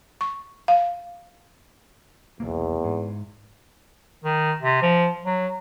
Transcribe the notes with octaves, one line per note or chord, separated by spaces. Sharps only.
C#6
F5
E1 B1 E2 A#3
G#2
D#3
C3
F3
F#3